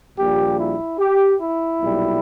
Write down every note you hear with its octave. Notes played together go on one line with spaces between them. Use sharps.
A#1 A#2 G3 G4
E4
G4
E4
B1 A#2 G3